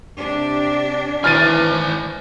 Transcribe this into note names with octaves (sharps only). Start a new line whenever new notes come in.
C3 D4 G4
D#3 E3 C5 G#5 F6 A6 D#7